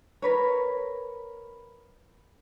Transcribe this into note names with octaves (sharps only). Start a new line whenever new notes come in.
A#4 B4 C#5